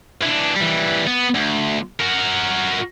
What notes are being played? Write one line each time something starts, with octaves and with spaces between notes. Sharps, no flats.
E3 D4
E3 G3
B3
D2
F#4 A#4